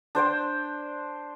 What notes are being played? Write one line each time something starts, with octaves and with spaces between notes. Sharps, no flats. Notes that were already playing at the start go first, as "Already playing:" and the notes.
D4 C5 D5 G5